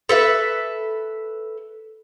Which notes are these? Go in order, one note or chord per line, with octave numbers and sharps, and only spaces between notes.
A4 B4 E5